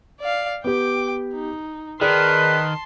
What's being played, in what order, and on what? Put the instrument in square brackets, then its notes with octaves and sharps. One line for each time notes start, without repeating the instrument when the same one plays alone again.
[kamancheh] D5 F5
[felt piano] B3 G4 [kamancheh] G5 D6
[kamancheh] D#4
[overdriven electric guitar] D#3 [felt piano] G#4 D5 [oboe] B4 [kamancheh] A5 C6